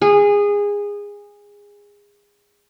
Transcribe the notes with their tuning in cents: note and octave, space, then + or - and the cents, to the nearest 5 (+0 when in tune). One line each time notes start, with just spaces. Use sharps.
G#4 -20